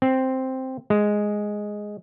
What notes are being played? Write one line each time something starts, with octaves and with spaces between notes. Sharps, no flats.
C4
G#3